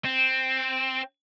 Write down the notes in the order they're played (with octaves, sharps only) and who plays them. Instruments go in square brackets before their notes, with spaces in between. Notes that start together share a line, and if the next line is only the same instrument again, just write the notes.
[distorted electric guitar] C4